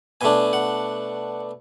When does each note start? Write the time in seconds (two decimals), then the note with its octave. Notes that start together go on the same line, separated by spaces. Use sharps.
0.21 B2 A3 D4 G#5
0.53 F#5